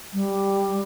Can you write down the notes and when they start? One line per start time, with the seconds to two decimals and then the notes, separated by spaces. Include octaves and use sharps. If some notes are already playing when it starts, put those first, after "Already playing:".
0.14 G3